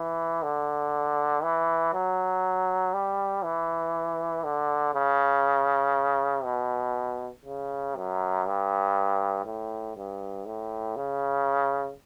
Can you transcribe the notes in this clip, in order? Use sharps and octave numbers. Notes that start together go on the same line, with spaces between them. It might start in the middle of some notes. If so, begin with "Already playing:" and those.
Already playing: E3
D3
E3
F#3
G3
E3
D3
C#3
B2
C#3
F#2
G2
A2
G2
A2
C#3